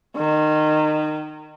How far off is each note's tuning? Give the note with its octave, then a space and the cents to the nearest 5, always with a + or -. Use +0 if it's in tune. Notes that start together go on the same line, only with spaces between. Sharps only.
D#3 -25